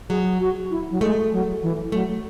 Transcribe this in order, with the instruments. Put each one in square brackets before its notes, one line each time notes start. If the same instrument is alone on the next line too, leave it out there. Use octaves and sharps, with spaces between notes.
[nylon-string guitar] F#3 [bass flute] G#4
[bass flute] F#4
E4
F#3
[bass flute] G#3 [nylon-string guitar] A3
[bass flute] F#3
E3
[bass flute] F#3 [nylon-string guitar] A3